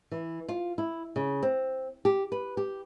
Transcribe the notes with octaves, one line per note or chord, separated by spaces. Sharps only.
E3
F4
E4
C#3
C4
G4
B4
G4